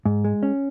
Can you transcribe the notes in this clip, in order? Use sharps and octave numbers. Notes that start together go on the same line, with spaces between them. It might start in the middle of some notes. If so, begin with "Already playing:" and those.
G#2
G#3
C#4